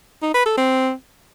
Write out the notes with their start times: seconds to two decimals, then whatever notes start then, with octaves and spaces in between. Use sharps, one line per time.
0.22 D#4
0.34 B4
0.46 A4
0.57 C4